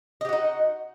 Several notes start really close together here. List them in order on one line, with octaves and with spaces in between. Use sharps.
D#5 G4 F#4 D#4